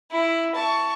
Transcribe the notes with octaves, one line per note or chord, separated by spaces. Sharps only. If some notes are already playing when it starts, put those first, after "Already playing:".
E4
A5 C#6